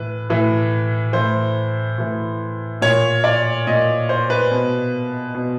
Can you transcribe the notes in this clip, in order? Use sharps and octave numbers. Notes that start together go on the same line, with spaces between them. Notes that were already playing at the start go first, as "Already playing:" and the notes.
Already playing: A2 E3 B4
A2 E3
A2 E3 C5
A2 E3
A#2 C#5
D5
A#2 D#5
C5
B4
B2
B2